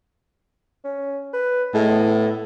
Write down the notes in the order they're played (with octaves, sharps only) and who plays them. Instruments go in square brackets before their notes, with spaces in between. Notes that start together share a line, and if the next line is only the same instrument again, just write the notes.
[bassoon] C#4
B4
[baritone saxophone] A2 [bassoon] G#3
[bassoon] B3